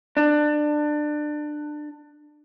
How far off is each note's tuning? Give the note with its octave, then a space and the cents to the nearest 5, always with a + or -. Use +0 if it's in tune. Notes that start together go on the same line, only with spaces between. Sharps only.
D4 +25